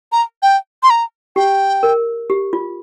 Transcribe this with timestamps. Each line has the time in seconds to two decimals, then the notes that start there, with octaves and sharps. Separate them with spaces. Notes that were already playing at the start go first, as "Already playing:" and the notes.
0.12 A#5
0.43 G5
0.83 C6
0.90 A#5
1.36 G4 G5
1.83 A#4
2.30 G4
2.53 F4